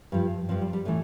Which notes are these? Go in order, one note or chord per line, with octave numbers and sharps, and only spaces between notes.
G2 F3
G2 F3 C4
G3
G3
A2 E3 A3